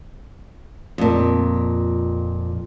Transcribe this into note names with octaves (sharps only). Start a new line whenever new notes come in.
F2 A#2